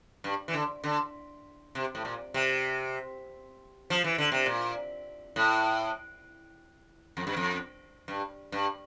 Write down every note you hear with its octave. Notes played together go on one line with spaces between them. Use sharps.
G2
E3
D3
D3
C3
A2
A#2
C3
F3
E3
D3
C3
A#2
A2
F2
G2
F2
G2
G2